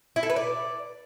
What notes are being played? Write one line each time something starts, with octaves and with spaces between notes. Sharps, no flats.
E4
A4
B4
D5